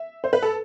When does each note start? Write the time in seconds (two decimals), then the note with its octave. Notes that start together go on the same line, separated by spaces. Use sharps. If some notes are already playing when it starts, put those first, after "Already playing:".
Already playing: E5
0.24 C5
0.33 B4
0.42 A4